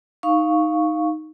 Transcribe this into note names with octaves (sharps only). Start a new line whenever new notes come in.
D#4 F5 C#6